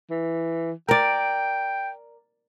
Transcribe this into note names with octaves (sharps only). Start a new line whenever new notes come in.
E3
A#4 D5 G5